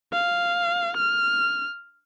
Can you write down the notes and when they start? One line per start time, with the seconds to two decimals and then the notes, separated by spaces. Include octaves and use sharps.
0.13 F5
0.97 F6